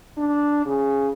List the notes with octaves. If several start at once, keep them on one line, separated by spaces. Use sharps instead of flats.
D4
C#3